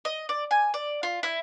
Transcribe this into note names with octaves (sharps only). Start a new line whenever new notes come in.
D#5
D5
G#5
D5
F4
E4